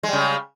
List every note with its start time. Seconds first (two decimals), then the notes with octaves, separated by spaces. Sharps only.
0.03 G#3
0.08 G3
0.13 C#3